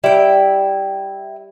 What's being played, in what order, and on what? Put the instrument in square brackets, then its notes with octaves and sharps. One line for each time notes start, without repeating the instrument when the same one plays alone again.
[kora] G3 [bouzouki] E4 G5